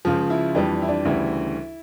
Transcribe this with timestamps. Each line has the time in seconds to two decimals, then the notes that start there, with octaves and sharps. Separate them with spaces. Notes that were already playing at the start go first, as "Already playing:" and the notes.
0.05 C#2 C#3 F3
0.30 E4
0.55 F2 E3 G3 D4
0.82 E4
0.89 D4
1.05 D2 C#3 E3 G3 E4